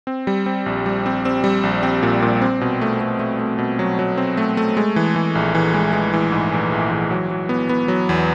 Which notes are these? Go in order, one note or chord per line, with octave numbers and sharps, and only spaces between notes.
C4
G3
C4
A#1
G3
C4
C4
G3
A#1
C4
A#2
A#2
C4
B2
A3
A3
A3
A3
B2
F#3
F#3
C4
A3
A3
G#3
E3
E3
A#1
E3
G#3
G#3
E3
G#2
A#1
A#1
E3
F#3
F#3
B3
B3
F#3
E2